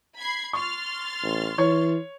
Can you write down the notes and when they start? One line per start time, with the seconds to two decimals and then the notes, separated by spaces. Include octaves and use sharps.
0.17 B5 G#6 C7
0.53 C6 C#6 F6 A6
1.23 A1
1.58 E3 C#5